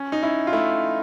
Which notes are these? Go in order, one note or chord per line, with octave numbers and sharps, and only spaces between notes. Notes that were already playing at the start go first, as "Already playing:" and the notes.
Already playing: C#4
D#4
C#4 E4
F4
A3 E4